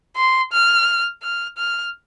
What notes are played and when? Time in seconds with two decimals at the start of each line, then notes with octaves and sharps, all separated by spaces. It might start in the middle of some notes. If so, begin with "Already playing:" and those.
0.16 C6
0.52 F6
1.23 F6
1.57 F6